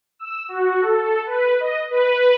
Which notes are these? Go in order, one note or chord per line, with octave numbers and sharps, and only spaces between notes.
E6
F#4
A4
B4
D#5
B4